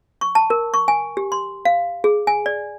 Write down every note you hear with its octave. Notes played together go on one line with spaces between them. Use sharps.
C#6
A5
A#4
C#6
G#5
G4
C6
F5
G#4
G#5
D5